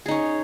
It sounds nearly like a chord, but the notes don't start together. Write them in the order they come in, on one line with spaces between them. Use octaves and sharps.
G#4 D#4 C#4